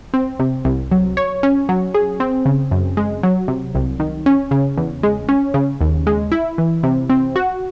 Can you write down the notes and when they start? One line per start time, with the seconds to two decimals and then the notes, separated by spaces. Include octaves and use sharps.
0.14 C4
0.40 C3
0.65 C2
0.91 F#3
1.17 C#5
1.43 C#4
1.69 F#3
1.94 G#4
2.20 C4
2.45 C#3
2.71 F#2
2.97 G#3
3.23 F#3
3.48 C3
3.75 C2
4.00 D#3
4.26 C#4
4.51 C#3
4.78 E2
5.03 G#3
5.29 C#4
5.54 C#3
5.81 D#2
6.07 G#3
6.32 E4
6.58 E3
6.83 C3
7.10 C4
7.36 F#4